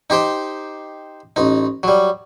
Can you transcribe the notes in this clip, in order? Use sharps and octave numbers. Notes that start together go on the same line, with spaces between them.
D#4 G4 C5 G5
A1 D#4
F#3 G3